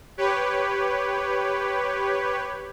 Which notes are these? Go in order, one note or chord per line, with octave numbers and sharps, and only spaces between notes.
G4 B4 C#5